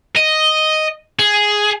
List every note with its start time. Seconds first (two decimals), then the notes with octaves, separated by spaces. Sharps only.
0.16 D#5
1.19 G#4